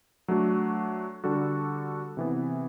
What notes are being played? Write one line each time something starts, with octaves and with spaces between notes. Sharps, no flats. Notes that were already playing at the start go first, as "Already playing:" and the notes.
F#3 A3 D4 F#4 A4
D3 G3 D4 F#4 A4
C3 E3 B3